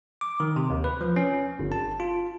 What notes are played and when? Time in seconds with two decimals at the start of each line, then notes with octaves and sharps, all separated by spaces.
0.21 D6
0.40 D#3
0.56 C3
0.70 D#2
0.84 B4
1.01 F3
1.16 C#4
1.59 G1
1.72 A5
2.00 F4